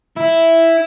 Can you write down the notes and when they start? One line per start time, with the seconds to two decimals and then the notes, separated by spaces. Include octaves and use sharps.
0.16 E4